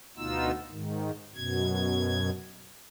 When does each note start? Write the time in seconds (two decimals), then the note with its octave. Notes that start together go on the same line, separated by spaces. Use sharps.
0.17 D2 B2 B3 D#4 F4 E6
0.71 G#2 D#3
1.35 F#2 B2 G#6